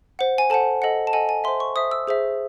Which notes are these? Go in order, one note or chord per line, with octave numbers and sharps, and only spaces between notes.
C5 F#5
G#5
A4 C5 F#5 A5
A4 D#5 F#5
A5
A4 D#5 F#5 G#5
G#5
C5 E5 C6
C#6
C5 E5 D#6
E6
G#4 C5 E5